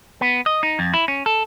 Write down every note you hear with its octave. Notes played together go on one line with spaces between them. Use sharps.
B3
D#5
D#4
F2
E4
C#4
A4